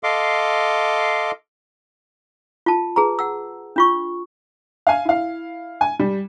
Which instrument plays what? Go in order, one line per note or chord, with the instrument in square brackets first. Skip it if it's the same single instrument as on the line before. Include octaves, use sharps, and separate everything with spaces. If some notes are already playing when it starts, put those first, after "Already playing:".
[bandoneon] A4 D#5 F5 C6 D6
[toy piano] F4 A5
G#4 B4 A#5
F#5 E6
D4 F4 C#6
[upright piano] F5 G#5
E4 F5
G#5
G3